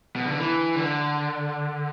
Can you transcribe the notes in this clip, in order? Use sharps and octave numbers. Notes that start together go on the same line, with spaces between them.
B2
D3
E3
D3